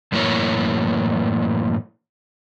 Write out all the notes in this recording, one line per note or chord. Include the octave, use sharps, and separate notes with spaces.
F#2 A2 E3 A#3 E4 C#5